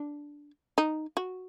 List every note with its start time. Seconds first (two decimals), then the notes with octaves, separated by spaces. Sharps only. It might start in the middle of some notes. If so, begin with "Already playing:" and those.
Already playing: D4
0.78 D#4
1.17 F#4